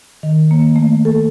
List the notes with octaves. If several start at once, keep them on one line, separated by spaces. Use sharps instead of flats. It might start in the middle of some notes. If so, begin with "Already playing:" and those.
D#3
A#3
A3
A4